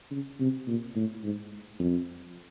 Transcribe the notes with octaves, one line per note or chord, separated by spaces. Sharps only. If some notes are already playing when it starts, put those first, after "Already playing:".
C#3
C3
A#2
A2
G#2
F2